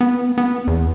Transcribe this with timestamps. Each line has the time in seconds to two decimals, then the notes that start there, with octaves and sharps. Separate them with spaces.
0.01 B3
0.38 B3
0.67 E2